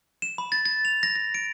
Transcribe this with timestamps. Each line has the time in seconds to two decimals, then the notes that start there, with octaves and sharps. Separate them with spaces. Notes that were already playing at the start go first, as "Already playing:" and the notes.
0.22 E7
0.38 B5
0.52 A6
0.65 A6
0.85 F7
1.03 A#6
1.15 A#6
1.34 D7